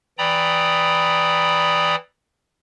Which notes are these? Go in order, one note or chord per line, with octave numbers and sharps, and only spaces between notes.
E3 D5 G5 A#5 B5 D#6